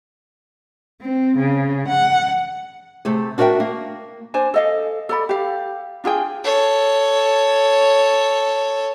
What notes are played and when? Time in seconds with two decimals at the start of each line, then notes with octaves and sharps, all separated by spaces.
1.01 C4
1.37 C#3
1.88 F#5
3.05 C3 A3 G4 G#4
3.38 D4 F#4 A#4 C#5 E5 G5
3.60 A#3
4.34 D4 C5 G#5
4.54 A4 D#5 F5
5.09 A4 D5 B5
5.29 G4 F5
6.04 D4 F4 G#4 G5
6.44 A4 C#5